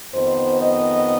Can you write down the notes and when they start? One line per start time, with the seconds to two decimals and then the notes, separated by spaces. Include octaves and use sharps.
0.14 F2 D#3 B3 C5
0.62 D#5